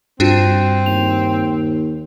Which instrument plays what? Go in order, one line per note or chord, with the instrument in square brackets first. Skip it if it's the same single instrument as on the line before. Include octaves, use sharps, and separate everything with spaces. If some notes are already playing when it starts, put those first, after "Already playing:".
[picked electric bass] G2 [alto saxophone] C4 [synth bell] D4 F4 F#4
[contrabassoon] D#2 [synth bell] F7